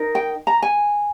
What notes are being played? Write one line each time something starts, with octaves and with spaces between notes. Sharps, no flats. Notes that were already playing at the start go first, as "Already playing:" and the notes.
Already playing: D#4 A#4
G5
A#5
G#5